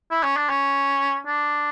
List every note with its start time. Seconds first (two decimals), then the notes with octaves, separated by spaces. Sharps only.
0.11 E4
0.23 C#4
0.37 D4
0.49 C#4
1.27 D4